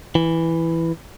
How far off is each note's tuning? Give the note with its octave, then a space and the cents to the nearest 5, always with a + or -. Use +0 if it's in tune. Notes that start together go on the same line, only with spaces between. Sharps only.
E3 +0